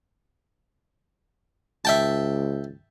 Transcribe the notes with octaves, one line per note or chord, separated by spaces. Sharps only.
C#2 E5 G5 A5